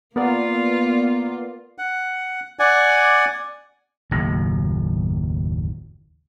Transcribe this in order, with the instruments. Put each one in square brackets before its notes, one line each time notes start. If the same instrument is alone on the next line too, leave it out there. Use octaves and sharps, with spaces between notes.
[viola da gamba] A#3 F4 [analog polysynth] B3 A#4 D5
[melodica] F#5
D5 F#5 G#5
[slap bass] F#1 D#2 A2 D#3